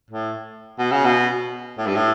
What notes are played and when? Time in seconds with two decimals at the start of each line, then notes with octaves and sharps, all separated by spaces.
0.11 A2
0.78 B2
0.91 C#3
1.05 B2
1.78 A2
1.87 G2
1.96 A2